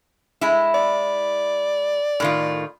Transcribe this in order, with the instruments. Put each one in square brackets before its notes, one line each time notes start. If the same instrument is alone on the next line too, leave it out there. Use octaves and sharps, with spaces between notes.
[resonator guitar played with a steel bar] G#3 E4
[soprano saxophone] D5
[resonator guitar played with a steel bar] A2 D#3 F4